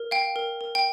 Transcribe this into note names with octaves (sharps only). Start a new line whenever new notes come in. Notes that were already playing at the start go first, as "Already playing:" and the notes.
Already playing: A#4
F5 G5
A#4
A#4
G5